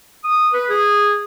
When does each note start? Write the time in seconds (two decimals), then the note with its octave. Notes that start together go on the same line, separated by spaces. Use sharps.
0.24 D#6
0.53 B4
0.70 G#4